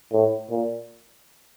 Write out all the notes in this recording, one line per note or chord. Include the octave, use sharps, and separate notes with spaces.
A2
A#2